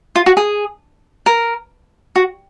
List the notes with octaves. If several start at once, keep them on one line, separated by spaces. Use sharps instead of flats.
F4
F#4
G#4
A#4
F#4